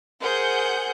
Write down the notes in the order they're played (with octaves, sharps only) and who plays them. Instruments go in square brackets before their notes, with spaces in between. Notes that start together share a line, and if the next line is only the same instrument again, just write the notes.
[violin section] G#4 F#5 G6 [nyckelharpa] A#4 C5